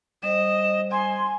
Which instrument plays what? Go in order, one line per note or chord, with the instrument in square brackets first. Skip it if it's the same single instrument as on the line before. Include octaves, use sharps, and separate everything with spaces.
[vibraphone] G3 C5 [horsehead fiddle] D#5 [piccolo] E7
[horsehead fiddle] G#5 [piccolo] C6